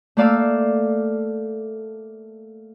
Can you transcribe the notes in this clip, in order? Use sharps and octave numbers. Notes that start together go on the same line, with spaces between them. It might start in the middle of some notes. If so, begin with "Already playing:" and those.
A3 A#3 D5 F5 E6